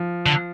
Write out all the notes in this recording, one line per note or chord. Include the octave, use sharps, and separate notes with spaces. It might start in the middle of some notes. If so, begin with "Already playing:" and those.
Already playing: F3
D3